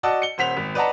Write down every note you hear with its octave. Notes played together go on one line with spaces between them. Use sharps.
F#4 D5 D#5 F#5 A5 E6
C#7 G7
D#1 C5 F#5 B6 F7
G#1
B4 D5 D#5 F#5 A5 A#5